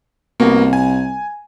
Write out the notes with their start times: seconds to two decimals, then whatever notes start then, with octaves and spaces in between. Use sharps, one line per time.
0.40 C2 A#3 B3 F#4
0.73 G#5